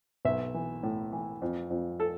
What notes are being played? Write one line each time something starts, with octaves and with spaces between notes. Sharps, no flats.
B1 E5
E3
A2
E3
F2
F2
A4